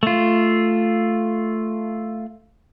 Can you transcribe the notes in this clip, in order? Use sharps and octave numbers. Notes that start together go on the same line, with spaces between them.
A3 F4